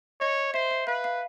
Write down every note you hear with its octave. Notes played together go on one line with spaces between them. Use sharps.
C#5 D#5
C5 E5
E5
B4 F5
F5